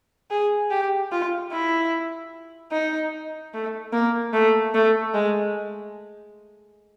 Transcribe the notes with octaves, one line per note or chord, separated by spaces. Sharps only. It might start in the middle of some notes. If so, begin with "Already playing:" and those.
G#4
G4
F4
E4
D#4
A3
A#3
A3
A3
G#3